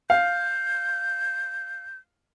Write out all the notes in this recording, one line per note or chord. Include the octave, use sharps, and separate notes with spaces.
F5 G6